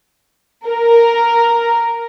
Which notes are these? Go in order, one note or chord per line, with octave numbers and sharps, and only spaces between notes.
A#4